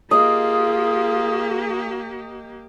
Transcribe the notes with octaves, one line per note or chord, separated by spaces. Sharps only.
A#3 F4 G4 G#4 D#5